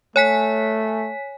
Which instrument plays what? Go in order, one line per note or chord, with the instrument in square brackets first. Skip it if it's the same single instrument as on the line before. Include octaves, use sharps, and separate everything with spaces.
[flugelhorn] A3 [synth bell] C#5 G#5 B6